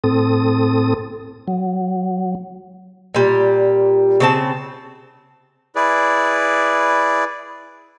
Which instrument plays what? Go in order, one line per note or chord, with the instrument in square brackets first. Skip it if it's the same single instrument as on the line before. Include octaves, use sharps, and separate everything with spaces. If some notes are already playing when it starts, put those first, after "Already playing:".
[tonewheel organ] A2 C4 A4 D#6
F#3
[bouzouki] A#2 G3
C#3 C4 A5
[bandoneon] E4 G#4 B4 D5